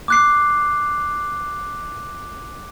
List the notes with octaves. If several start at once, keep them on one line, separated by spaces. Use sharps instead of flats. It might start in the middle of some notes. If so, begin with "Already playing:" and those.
D6 F#6 C7